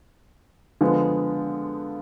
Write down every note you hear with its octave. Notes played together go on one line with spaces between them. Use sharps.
D3 F3 G#3 B3